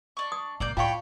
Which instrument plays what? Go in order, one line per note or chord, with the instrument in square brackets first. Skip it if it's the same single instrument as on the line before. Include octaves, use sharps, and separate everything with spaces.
[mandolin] D4 C#6
[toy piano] D#6
[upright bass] A#2 [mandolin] A#3 D5 G6
[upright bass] A2 [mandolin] D4 C#5 B5 [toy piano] F4 F5 C#6 [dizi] G5